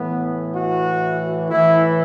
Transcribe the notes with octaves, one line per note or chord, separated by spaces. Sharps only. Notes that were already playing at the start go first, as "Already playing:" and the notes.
Already playing: A2 E3 B3
F#4
A2 E3 E4